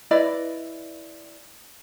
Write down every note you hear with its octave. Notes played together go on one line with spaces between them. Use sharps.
E4 B4 D5 D#5